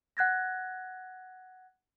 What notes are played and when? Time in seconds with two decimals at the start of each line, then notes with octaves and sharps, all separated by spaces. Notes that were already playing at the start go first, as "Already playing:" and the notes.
0.17 F#5 F#6 G#6 A#6